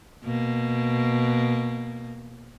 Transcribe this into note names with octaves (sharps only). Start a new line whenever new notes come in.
B2 A#3